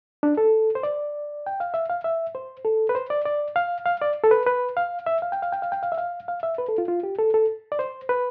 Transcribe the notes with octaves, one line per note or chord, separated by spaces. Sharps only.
D4
A4
C5
D5
G5
F5
E5
F5
E5
C5
A4
B4
C5
D5
D5
F5
F5
D5
A4
B4
B4
F5
E5
F5
G5
F5
G5
F5
G5
F5
E5
F5
F5
E5
B4
A4
F4
F4
G4
A4
A4
D5
C5
B4